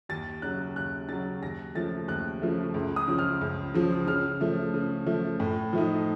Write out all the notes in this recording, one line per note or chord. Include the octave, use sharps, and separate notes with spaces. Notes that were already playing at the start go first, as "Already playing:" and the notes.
D#2 A6
C#3 F#3 F#6
D#2 F#6
C#3 F#3 A6
D#2 A#6
C#3 F3 A3 A6
D#2 F#6
C#3 F3 A3
C#2
D#6
C#3 F3
F6
C#2
C#3 F3
C#3 F6
F3 A3
C#3
F3 A3
A2
F3 A3 D#4